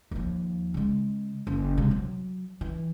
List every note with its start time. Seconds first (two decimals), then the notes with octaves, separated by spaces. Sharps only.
0.11 D#2 F3
0.74 C#3 G#3
1.47 F#1
1.78 C3 G#3
1.91 F#3
2.61 E3